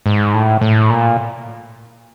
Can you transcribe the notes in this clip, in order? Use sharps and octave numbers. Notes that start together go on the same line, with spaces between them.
G#2
A2
A2
A#2